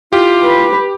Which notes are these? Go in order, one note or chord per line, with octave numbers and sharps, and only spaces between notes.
E4 F4 G4
B4